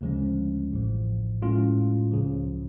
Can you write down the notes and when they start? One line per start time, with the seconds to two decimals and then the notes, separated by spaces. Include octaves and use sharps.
0.01 D2 C#3 F3 G#3 C#4
0.72 A1 A2 F3
1.41 A2 G#3 C#4 F4
2.12 C#2 C#3 F3